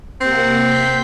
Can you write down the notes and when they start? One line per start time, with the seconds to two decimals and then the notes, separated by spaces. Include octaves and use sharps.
0.21 C3 A#3 C4 F#5
0.63 G6 B6